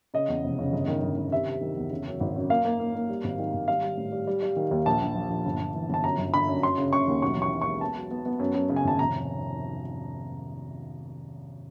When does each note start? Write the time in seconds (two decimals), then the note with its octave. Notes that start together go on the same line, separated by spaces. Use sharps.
0.14 C#3 D#5
0.28 E2
0.44 F1
0.59 C#3
0.73 G1
0.88 D#3
1.02 G1
1.17 D#3
1.32 C3 E5
1.47 C3
1.61 D#3
1.77 E2
1.91 C#3
2.06 F#2
2.20 G#1
2.36 F#2
2.50 A#3 F5
2.65 A#3
2.80 A#3
2.95 A#3
3.09 G3
3.24 G#1
3.39 D#3
3.53 G#1
3.68 G3 F5
3.82 G3
3.97 A2
4.12 G3
4.27 G3
4.42 G3
4.56 D#3
4.71 D#2
4.86 A#1 A5
5.01 A#1
5.15 F3
5.30 A#1
5.46 G1
5.59 G1
5.75 E3
5.90 G1 A5
6.04 F#2 A#5
6.18 G1
6.33 D3 B5
6.48 F#2
6.62 F#3 C6
6.78 C#3
6.93 C#3 C#6
7.08 D#2
7.22 B1 C#6
7.37 E3 C#6
7.51 B1
7.62 G#3 C#6
7.81 B3 A5
7.96 F#3
8.11 B3
8.26 B3
8.39 F#2
8.54 F#2
8.69 C#3
8.76 G#5
8.84 G#1 A5
8.99 F1 A#5